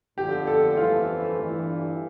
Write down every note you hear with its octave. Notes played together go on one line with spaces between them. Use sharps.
G1 F2 D3 F3 G4
A4
G1 F2 E3 A3 F4
G1 G2 E3